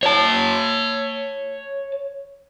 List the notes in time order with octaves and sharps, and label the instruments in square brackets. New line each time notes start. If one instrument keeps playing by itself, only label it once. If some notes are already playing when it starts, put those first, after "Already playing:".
[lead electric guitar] C#5 A5